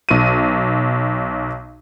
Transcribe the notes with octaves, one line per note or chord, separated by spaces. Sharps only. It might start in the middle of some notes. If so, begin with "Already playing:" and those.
B1 D#7